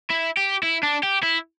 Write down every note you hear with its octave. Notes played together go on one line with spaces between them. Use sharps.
E4
G4
E4
D4
G4
E4